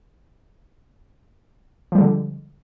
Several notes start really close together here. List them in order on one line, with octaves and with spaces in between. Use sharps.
F3 G3 G#3 D3